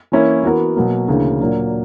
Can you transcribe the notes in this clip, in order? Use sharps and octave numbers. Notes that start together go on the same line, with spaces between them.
E3 A#3 C#4 E4 A#4
E3 B3 F#4 A#4
B2 F#3 A#3
D2 C#3 E3 A#3
A#2 F#3 A#3 D4